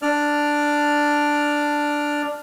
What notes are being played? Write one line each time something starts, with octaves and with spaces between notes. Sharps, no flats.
D4 D5 F6